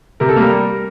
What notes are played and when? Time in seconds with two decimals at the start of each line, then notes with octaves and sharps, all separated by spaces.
0.20 C3 A#4
0.29 A4
0.36 G3 A#3 A#4